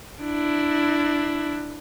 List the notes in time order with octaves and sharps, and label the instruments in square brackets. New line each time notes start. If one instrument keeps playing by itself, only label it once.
[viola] D4 E4